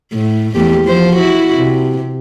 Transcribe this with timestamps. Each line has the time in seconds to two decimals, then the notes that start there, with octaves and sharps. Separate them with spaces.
0.13 A2
0.54 E2 A3 G4
0.85 F3 C5
1.16 E4 F#4
1.55 C3